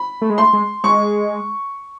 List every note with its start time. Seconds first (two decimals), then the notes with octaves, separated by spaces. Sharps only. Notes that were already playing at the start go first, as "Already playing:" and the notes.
Already playing: B5
0.22 A3
0.30 G#3
0.38 A3 C6
0.53 G#3
0.84 G#3 C#6